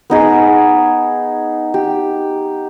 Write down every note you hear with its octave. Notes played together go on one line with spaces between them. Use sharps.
B3 D#4 G#4
G4